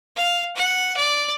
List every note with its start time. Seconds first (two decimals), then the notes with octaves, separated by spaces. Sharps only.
0.16 F5
0.56 F#5
0.96 D5